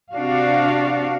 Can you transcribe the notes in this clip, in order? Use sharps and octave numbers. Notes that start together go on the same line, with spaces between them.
C3 D4 F#4 F5